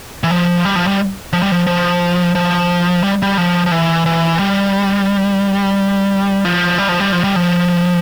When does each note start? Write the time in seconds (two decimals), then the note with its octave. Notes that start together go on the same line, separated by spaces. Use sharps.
0.24 E3
0.31 F3
0.65 G3
0.76 F3
0.87 G3
1.33 F3
1.42 G3
1.51 F3
1.67 F3
2.35 F3
3.03 G3
3.22 G3
3.38 F3
3.66 F3
3.71 E3
4.06 E3
4.39 G3
6.45 F3
6.78 G3
6.89 F3
7.00 G3
7.12 F3
7.24 G3
7.36 F3